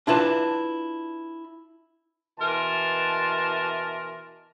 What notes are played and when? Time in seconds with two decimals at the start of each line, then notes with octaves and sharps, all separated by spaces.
0.07 D4 E4 F4 B4 A5
2.40 B2 E3 A#4 A5 C6